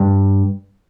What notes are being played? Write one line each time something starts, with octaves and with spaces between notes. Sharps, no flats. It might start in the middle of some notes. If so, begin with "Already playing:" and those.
Already playing: G2